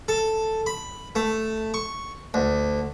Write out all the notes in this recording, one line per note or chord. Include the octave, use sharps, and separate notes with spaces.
A4
B5
A3
C#6
D2